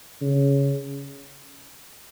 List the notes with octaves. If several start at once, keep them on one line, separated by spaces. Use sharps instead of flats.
C#3